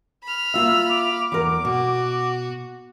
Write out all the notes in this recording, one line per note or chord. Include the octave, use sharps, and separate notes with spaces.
B5 F6
A#3 F4 E5 E6
D6
E2 A#4
B2 F#4